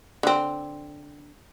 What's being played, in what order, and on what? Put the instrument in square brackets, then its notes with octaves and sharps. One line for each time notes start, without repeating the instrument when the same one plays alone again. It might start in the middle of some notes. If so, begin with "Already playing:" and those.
[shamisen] D3 C4